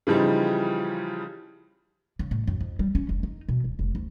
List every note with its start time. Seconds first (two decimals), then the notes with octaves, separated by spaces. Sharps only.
0.07 C#3 E3 F3 G3 D#4
2.19 C#3
2.31 A2
2.47 F#2
2.61 F2
2.79 G3
2.95 C#4
3.09 F1
3.23 D#4
3.49 B2
3.64 D1
3.79 F1
3.95 D2